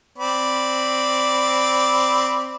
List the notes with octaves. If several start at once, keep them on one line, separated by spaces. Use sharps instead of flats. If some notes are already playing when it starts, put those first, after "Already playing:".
C4 D5 B5